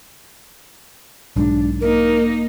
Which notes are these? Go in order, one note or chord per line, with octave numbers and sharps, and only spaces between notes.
B1 G#2 D4
A#3 D#4 A#4